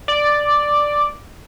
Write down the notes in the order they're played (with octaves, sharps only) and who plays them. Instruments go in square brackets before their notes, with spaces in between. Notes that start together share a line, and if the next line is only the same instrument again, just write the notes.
[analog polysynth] D5